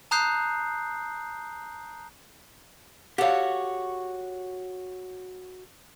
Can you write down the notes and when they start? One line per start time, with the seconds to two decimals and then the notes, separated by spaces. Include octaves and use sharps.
0.11 A5 A#5 D#6 F#6 G6 C7
3.18 F#4 G4 A4 C#5 F5